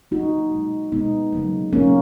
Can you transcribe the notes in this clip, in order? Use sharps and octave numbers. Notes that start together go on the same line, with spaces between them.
C#3 F#3 A#3 D#4 F#4
B2 G#3
B2 G#3 B3 D#4
C#3 F#3 A#3
C#3 F#3 A#3 C#4